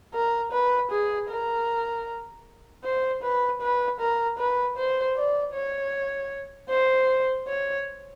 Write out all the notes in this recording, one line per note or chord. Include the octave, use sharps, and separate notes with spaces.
A#4
B4
G#4
A#4
C5
B4
B4
A#4
B4
C5
D5
C#5
C5
C#5